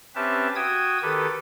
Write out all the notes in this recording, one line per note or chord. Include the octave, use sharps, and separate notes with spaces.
C4 C#4 G4 B4 E5 A5
F#4 G5 D#6 E6 G#6
D#3 G4 A4 B4